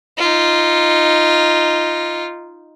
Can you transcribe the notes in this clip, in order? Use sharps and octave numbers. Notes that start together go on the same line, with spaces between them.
D#4 F4